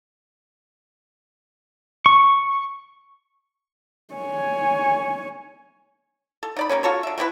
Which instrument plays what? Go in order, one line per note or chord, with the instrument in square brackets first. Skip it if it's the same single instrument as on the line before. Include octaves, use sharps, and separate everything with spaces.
[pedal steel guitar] C#6
[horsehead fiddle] C#5 G#5
[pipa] A4
D#4 D5 B5
G3 A#3 B3 C#4
F4 F#4 A4 C#5
D3 E5
A3 C4 E4 B4